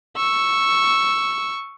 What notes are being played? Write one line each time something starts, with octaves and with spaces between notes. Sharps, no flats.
C#6 E6